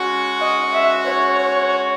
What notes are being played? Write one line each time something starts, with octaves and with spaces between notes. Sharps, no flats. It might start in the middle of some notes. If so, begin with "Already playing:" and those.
Already playing: G#3 C#4 F#4
D#5
E5
C#5